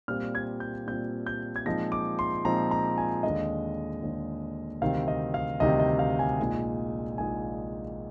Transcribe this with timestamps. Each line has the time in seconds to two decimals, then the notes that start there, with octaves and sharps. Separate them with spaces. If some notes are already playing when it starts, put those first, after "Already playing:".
0.08 A#2 G3 C4 F4 F6
0.35 G#6
0.60 G6
0.87 A#2 G3 C4 F4 G6
1.27 G6
1.56 G#6
1.66 A#2 F3 G#3 C4 D#4 A#6
1.92 D6
2.19 C6
2.45 A#2 F3 G#3 C4 D#4 A#5
2.71 A#5
2.98 G#5
3.23 D#2 D3 G#3 D#5
4.03 D#2 D3 G#3
4.81 D2 C3 D#3 G3 C4 F5
5.08 D#5
5.34 F5
5.60 D2 C3 D#3 G3 C4 D#5
5.80 D#5
5.99 F5
6.19 G#5
6.39 A#1 A#2 G#3 D#4
7.18 A#1 A#2 G#3 D#4 G#5